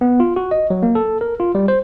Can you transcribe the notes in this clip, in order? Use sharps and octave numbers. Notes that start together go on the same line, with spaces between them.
B3
F4
F#4
D#5
F#3
A#3
A4
A#4
F4
G3
C5